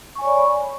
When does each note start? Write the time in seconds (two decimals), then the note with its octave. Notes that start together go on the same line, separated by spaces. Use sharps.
0.15 C#6
0.19 G#5
0.22 C#5
0.25 D5
0.28 B5